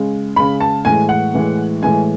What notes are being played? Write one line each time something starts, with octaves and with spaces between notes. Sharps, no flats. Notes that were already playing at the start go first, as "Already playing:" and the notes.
Already playing: C#3 G#3
C#3 G#3 B5
A5
A2 E3 G#3 G#5
F#5
A2 E3 G#3
A2 E3 G#3 G#5